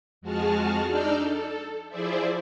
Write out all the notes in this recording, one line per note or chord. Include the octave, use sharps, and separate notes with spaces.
F2 G#3 F#4 G#4 A5 F6
D4 D#4 D5 E6 F6 G6
A4
F3 E4 G#4 C5 D5 E5